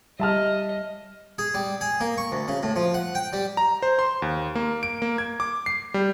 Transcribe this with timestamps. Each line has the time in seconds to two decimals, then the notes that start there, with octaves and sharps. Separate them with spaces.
0.20 G3 D#5 E5 A5 F6
1.38 G#4
1.54 G3
1.81 G#4
2.01 A#3
2.18 C#6
2.32 D2
2.48 C#3
2.63 A2
2.76 F3
2.94 F#5
3.15 G5
3.33 G3
3.57 A#5
3.82 C5
3.99 C6
4.22 D#2
4.55 A#3
4.83 D7
5.02 A#3
5.18 G#6
5.40 D6
5.66 C7
5.94 G3